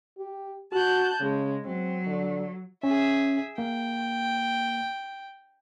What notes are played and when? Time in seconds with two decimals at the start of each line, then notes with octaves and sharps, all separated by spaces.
0.18 G4
0.72 F#4 A5 F#6 G6
1.21 C#3 G#3
1.65 F#3 C4
2.07 D3
2.83 C#4 G#4 E5
3.58 A#3 G5